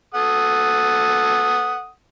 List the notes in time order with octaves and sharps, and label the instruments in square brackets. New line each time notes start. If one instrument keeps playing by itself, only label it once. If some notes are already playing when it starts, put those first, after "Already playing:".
[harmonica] A4 F#5 D#6